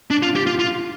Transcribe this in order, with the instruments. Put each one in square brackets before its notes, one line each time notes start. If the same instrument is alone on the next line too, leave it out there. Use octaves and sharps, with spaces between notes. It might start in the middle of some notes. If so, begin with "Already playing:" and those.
[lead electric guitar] D4
F4
G4
F4
F4